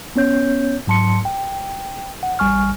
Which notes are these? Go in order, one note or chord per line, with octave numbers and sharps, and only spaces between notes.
B3 C#4 C#5 G6
G#2 F#3 A5 C6 C#7
G5
F#5
A1 G3 G#5 C#6 F6